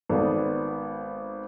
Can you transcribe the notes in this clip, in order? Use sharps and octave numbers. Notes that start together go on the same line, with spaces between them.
G#1 B3 A4 D5